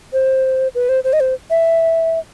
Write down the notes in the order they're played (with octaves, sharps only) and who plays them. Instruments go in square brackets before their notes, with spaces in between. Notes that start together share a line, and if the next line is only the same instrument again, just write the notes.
[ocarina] C5
B4
C5
C5
D#5
C5
E5